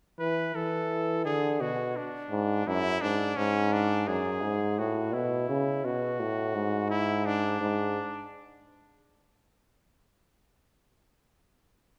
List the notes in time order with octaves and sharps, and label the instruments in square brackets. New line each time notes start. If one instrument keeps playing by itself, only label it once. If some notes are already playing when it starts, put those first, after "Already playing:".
[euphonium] E3 [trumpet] B4
[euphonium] E3 [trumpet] A4
[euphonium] D3 [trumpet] G#4
[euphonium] B2 [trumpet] F#4
[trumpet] D4
[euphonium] G#2
[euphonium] F#2 [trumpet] E4
[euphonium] G#2 [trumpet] D4
[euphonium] G#2 [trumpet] C#4
[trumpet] D4
[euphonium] F#2 [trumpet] G#4
[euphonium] G#2
[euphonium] A2 [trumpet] F#4
[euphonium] B2 [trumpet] E4
[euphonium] C#3
[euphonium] B2 [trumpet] F#4
[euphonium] A2
G#2
[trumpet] E4
D4
[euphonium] G#2